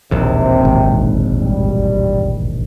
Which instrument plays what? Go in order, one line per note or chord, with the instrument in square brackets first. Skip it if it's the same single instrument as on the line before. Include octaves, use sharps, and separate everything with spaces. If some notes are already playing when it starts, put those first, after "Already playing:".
[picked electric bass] E1 A#1 D#2 [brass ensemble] C3
[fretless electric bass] G#1
[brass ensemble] G3